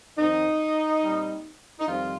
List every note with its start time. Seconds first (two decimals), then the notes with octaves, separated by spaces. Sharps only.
0.17 F2 D#3 C4 D#4
1.03 A#2 G3 C4
1.80 D#4
1.87 F2 D#3 G3 C4 F4